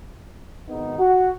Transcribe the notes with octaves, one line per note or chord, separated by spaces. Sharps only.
G#1 G#2 D#3 B3 D#4
F#4